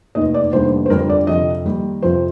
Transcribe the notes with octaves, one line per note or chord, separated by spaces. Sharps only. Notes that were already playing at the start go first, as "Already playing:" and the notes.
F1 D#2 D#3 D#5
D5
F1 D#2 D3 G3 C5
C5
G1 F2 D3 G3 A#4
D5
F2 C3 F3 D#5
D#2 D#3 G3
F2 C3 F3 C5